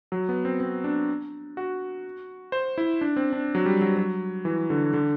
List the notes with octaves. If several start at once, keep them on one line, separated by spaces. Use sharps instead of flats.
F#3
B3
C4
C4
D4
F#4
C5
E4
D4
C4
D4
F#3
G3
F#3
F#3
E3
D3
D3